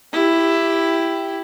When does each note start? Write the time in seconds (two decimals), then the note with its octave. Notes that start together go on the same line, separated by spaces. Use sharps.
0.13 E4 G4